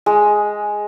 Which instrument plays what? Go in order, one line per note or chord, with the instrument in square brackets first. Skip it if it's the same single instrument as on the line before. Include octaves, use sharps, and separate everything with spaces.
[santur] G#3